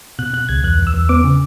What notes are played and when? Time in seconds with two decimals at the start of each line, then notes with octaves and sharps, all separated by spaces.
0.19 B2 F#6
0.33 B2 F#6
0.49 C#2 G#6
0.64 E2 F#6
0.79 E2
0.87 E6
0.94 E2
1.09 B3 D6
1.24 C#3